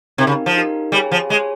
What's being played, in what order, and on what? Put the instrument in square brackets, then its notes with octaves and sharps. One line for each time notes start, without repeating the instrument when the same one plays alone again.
[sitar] C3 [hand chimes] D#4 G4 A#4
[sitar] C#3
F3
[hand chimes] D#4 G4 A#4
[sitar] G3 [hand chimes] G#4 C#5 G#5
[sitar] F3
[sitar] G#3 [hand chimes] G#4 C#5 G#5